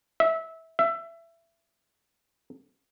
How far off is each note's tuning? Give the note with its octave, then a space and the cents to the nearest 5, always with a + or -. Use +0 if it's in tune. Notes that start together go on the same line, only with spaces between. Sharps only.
E5 -20
E5 +20